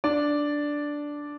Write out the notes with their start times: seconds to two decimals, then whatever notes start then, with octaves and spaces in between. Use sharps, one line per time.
0.04 D4 D5